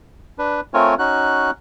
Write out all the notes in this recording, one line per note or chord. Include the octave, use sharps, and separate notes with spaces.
D4 B4
A3 C4 F4 A#4 C#5 G#5
C#4 D#4 F#4 F#6